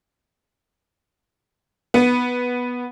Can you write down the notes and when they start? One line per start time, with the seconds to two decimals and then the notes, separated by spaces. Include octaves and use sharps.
1.94 B3